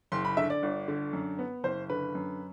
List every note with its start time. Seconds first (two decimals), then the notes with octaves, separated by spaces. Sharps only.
0.12 F#1 C6
0.25 B5
0.37 D3 E5
0.50 D5
0.63 G1
0.88 D3
1.13 F#2
1.39 B3
1.64 F#1 C5
1.90 D3 B4
2.15 F#2